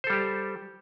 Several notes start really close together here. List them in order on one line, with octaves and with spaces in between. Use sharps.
C5 A4 G3 G4